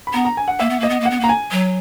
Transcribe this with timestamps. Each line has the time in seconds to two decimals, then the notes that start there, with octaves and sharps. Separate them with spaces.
0.07 B5
0.13 B3 A#5
0.25 A#5
0.37 G#5
0.48 F#5
0.59 A#3 E5
0.70 B3
0.80 A#3 D#5
0.89 B3
1.00 A#3
1.05 B3 F#5
1.20 A#3 A#5
1.29 G#5
1.51 F#3